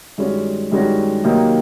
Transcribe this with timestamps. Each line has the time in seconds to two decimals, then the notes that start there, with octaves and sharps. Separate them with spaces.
0.18 G2 D#3 G#3 C#4 F#4
0.72 G2 D#3 G#3 C#4 F#4
1.24 C3 D#3 F#3 A#3 D#4